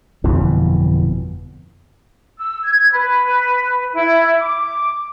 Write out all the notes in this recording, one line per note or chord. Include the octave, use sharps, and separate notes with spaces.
G1 F2 B2 E3
E6
G#6
B4
E4
D6